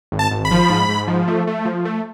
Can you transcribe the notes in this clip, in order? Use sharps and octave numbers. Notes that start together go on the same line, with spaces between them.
G#1
A5
G#1
B5
F3
G#2
G#2
F3
A3
A3
F3
A3